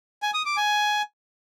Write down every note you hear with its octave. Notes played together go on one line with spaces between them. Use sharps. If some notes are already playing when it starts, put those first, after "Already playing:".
G#5
D#6
D6
G#5